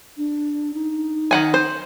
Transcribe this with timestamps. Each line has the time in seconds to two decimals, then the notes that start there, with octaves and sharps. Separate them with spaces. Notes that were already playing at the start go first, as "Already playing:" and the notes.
0.17 D4
0.74 D#4
1.31 D#3 F#5 G#5
1.54 C5